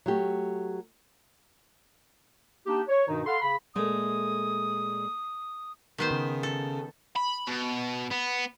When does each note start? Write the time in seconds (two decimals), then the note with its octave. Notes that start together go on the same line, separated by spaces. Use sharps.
0.06 F#3 A3 G4
2.67 A#3 D4 D#4 G4
2.88 C#5
3.08 G2 B2 D#3 D#4
3.26 A4 F5 F#5 B5 C6
3.42 C#3 B5
3.75 A#2 G#3 A3 D#6
5.98 D#3 B3 C5
6.11 C#3
6.43 A4
7.16 B5
7.47 B2
8.11 B3